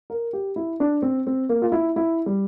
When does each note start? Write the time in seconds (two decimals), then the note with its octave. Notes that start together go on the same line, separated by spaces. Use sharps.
0.10 A#4
0.33 G4
0.56 E4
0.80 D4
1.02 C4
1.27 C4
1.49 A#3
1.62 F4
1.72 E4
1.96 E4
2.26 G3